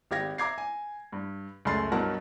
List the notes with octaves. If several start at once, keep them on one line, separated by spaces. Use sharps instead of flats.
G#1 G4 F5 G#6 A#6
E5 A#5 D6 G#6 C7
G#5
G2
C#2 F#2 A3 C6 A6 C7
G2 B2 F#3 A#4 F#5 A5